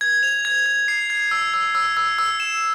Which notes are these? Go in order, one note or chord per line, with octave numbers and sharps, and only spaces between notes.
G#6
F7
G#6
G#6
C7
G#6
E6
E6
E6
E6
E6
E7